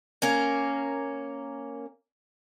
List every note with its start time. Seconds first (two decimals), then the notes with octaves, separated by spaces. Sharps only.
0.22 A#3 C#4 A#4